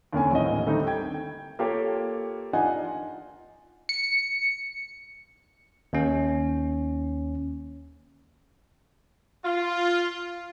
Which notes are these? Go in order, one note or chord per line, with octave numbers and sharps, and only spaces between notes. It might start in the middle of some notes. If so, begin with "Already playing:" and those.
D#2 D3 A#3 C4 C#4 G#5
D#1 A1 A2 D#3 C4 D#5
D3 D#3 G3 A3 C4 D#4
G5 G#6
A#3 F4 G4 A4 A#4 C#5
D4 D#4 F4 D#5 F#5 G#5
C#7
D#2 C#4
F4